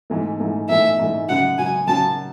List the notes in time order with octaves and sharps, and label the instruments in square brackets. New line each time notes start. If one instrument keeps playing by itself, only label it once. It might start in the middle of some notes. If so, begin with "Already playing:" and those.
[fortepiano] G#2 E3 A3
G#2 E3 A3
[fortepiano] G#2 E3 A3 [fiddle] E5
[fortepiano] G#2 E3 A3
[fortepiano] F#2 C#3 F#3 [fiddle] F#5
[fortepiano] F#2 C#3 F#3 [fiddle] G#5
[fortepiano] F#2 C#3 F#3 [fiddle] A5